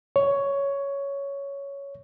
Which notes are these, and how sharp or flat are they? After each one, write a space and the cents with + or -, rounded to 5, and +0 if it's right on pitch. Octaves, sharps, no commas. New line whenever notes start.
C#5 +10